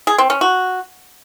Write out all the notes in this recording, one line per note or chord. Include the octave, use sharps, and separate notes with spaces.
G#4
C4
C#4
F#4